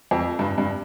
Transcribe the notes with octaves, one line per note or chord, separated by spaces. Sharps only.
F2
G2
G2